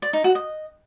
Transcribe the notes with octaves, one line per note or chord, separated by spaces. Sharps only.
D5
D#4
F#4
D#5